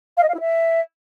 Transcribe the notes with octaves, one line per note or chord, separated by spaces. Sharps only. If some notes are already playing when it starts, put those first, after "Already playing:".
F5
D#5
F5
E4
E5